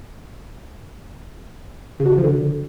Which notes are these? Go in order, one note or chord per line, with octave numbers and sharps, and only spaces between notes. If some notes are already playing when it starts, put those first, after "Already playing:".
C#3
F#4
C#3
F3
D3